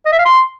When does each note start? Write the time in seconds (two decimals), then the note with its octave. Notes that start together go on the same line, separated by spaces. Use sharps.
0.06 D#5
0.12 E5
0.19 F5
0.25 C6